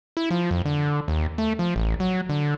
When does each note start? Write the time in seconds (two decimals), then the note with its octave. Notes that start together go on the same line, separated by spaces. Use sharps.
0.17 E4
0.31 F3
0.51 F2
0.65 D3
1.08 D#2
1.38 A3
1.59 F3
1.76 A1
2.00 F#3
2.29 D3